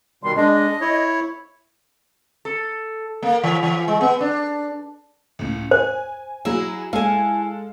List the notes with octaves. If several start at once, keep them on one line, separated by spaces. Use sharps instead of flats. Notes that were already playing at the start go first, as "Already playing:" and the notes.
B2 D#3 G3 C6
G#3 D4 D#5
D#5
E4 C#5
A4
A#3
E3
E3
G#3
B3
D4
C#2 A2
C5 G#5
F#3 E4 G#4
G#3 E4 A4 F5 G#5